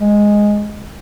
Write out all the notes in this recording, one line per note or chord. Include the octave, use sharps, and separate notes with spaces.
G#3